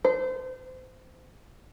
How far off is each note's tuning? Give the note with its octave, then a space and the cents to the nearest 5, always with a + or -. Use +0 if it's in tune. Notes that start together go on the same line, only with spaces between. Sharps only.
C5 -30